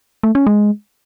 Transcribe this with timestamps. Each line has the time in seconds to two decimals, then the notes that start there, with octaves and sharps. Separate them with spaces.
0.23 A3
0.35 C#4
0.47 G#3